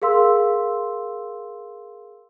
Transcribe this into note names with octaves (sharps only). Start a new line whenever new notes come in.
G#4 A#4 F5 C6 E6